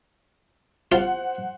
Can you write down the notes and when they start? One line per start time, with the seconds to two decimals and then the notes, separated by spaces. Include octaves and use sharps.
0.92 F4 C5 F#5